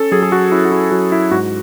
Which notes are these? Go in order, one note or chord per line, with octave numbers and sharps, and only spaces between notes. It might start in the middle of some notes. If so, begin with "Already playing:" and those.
Already playing: C#4 A4
F#3 G#4
G#4
F#4
C#4 E4
F#4
E4
F#3 F#4
E4
G#2 F#4